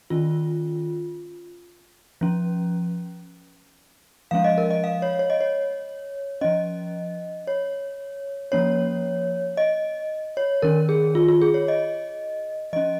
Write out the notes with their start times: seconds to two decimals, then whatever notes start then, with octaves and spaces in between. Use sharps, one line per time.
0.10 D#3 C#4 F4
2.21 F3 C#4
4.31 F3 G#3 C#4 F5
4.44 D#5
4.58 A#4
4.71 D#5
4.84 F5
5.02 C#5
5.19 C#5
5.30 D#5
5.41 C#5
6.41 F3 C#4 D#5
7.47 C#5
8.52 F3 A#3 C#4 C#5
9.57 D#5
10.37 C#5
10.62 D#3 C#4 A#4
10.89 G#4
11.15 F4
11.28 F4
11.41 G#4
11.54 C#5
11.68 D#5
12.73 F3 C#4 D#5